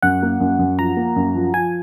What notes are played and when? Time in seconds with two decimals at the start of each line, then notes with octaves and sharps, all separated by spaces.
0.02 F#2 F#5
0.23 A#3
0.40 F#2
0.59 F#2
0.78 F3 A#5
0.97 A#3
1.16 F#2
1.35 F3
1.53 F3 G#5